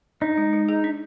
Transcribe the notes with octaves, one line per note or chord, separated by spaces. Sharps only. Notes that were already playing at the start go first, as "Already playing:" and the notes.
D4 D#4
G#3
G#3
G#4
D4